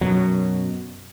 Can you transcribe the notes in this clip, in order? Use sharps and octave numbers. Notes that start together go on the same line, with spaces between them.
F#2 B2 F#3